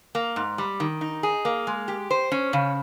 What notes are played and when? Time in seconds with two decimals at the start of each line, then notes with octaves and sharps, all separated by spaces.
0.15 A#3
0.36 G#2
0.58 G3
0.80 D#3
1.01 D#4
1.23 G#4
1.45 A#3
1.67 G#3
1.88 G4
2.11 C5
2.32 C#4
2.53 C#3